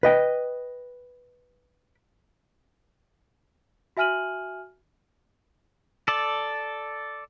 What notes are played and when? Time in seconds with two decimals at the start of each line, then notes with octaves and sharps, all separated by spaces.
0.03 B4 D#5 G5
3.97 F#4 E5 G#5 F6 D#7 F#7
6.08 A4 D5